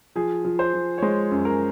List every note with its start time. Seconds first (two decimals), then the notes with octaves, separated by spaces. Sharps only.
0.16 F3 G#4
0.45 F3
0.59 C5
0.74 F3
0.98 C#5
1.02 G#3 C5
1.31 F#2
1.45 A#4